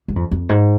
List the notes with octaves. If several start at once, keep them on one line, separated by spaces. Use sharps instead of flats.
G#2
F2
F2
G#2